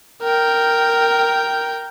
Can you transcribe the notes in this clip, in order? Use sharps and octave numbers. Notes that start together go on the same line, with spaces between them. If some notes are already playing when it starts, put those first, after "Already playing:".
A#4 G5